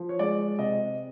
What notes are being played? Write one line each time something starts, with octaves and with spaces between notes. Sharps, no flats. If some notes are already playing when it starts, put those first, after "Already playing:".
Already playing: F3
C#5
G#3 D5
C3 D#5